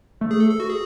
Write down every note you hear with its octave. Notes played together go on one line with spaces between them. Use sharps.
A3
G#4
A4
A4
F#4
G#4